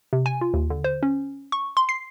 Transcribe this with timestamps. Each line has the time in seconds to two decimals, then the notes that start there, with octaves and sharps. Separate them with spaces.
0.13 C3
0.26 G#5
0.41 F4
0.54 D#2
0.70 D3
0.84 C5
1.03 C#4
1.52 C#6
1.77 C6
1.89 C7